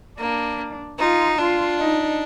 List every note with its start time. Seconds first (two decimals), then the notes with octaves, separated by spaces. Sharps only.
0.18 A#3 D4
0.99 D#4 F4
1.38 D4 F4
1.79 D#4